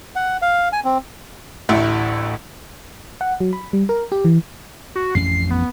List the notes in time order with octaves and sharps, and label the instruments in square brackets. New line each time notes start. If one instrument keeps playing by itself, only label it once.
[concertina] F#5
F5
G#5
C4
[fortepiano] A1 D2 A3 E4 A4
[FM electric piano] F#5
F#3
B5
G3
A#4
G4
E3
[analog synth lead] F#4
[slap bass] A1 F2 C#4 [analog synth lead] C7
[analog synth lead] B3